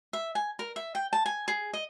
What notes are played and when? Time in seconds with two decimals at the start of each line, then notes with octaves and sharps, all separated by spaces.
0.13 E5
0.35 G#5
0.59 A#4
0.76 E5
0.95 G5
1.13 A5
1.26 G#5
1.48 G#4
1.73 D#5